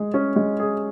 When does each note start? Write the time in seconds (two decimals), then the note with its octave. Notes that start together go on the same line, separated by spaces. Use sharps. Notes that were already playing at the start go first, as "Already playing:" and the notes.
Already playing: G#3 G#4
0.14 C#4
0.36 G#3
0.59 G#4